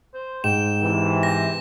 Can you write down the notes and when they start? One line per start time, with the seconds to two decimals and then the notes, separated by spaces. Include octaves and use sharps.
0.14 C5
0.44 G#2 G5 E7
0.81 C3 E3
1.23 C4 A#6